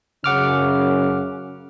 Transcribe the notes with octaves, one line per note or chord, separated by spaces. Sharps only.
F#2 C#3 F#5 D6 F6